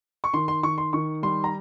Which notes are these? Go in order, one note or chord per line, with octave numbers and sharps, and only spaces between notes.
C#6
D#3 C6
C6
D#3 C#6
C6
D#3 C#6
G3 C6
A#5